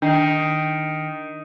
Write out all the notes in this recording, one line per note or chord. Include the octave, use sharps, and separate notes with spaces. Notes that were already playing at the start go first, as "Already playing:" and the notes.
D#3 D4 C7